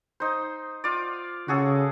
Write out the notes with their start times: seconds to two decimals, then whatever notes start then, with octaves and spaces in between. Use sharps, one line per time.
0.20 D#4 C5
0.84 F4 D5
1.48 C#3 F#4 G#4 A4